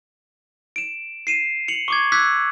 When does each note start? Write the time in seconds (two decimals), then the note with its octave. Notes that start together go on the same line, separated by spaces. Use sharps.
0.76 D7 E7
1.27 C7 D#7 E7
1.68 C#7 F7 F#7
1.88 C#6 D6 G#6
2.12 D6 E6 F#6 G#6 B6